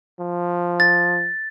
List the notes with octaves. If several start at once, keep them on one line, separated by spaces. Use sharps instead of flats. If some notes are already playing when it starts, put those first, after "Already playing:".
F3
A6